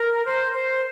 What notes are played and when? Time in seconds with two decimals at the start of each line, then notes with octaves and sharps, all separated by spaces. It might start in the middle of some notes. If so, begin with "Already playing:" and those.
Already playing: A#4
0.25 C5
0.52 C5